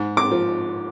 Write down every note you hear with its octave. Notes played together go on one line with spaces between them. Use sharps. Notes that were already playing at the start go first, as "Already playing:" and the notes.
Already playing: G#2
D6
F3